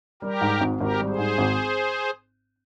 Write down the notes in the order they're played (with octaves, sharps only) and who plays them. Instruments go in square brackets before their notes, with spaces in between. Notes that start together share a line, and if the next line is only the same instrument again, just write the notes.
[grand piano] G3 [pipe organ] G4 A#4
[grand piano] G#2
G#1
[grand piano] G#1 [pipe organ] G4 A#4
[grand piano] G3
[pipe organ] G#4 C5
[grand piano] G#2
G#1